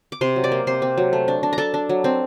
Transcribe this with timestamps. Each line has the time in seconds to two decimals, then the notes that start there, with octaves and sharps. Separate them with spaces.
0.12 D6
0.21 C3 C5 C6
0.36 F#3
0.44 D5 D6
0.52 A#3
0.67 C3 C5 C6
0.82 C4
0.98 F#3
1.13 A3
1.28 D4
1.43 D4
1.53 A#5
1.58 D4 A4 A5
1.74 D4
1.89 F#3
2.04 C4